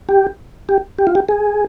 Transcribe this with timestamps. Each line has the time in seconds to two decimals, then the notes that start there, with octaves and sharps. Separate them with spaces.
0.09 G4
0.69 G4
0.99 G4
1.07 F4
1.15 G4
1.29 G#4